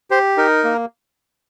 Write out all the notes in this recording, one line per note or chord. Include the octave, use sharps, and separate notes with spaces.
G4 C5
D#4 A#4
A#3